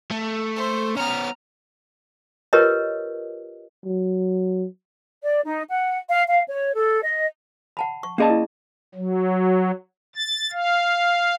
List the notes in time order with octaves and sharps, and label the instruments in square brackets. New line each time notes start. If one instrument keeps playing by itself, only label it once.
[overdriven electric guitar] A3
[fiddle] C5
[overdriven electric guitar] B3 C#4 [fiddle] A#5 F6
[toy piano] F4 G4 A#4 B4 C#5 D#5
[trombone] F#3
[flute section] D5
D#4
F#5
F5
F5
C#5
A4
D#5
[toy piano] F#5 A5 B5
C#6
[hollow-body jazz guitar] A#3 D#5 A5 [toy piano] C#4 G#4 D5
[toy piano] E4
[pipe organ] F#3
A6
F5